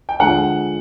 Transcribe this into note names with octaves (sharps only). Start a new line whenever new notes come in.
G5
D3 F3 G#3 F#5